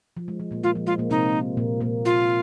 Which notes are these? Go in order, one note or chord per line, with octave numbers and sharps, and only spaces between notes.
F3
G#3
F3
A#2 A#3
G#3 F4
F3
G#3 F4
A#2 A#3
C3 C4 D#4
A#2 A#3
A#2 A#3
F4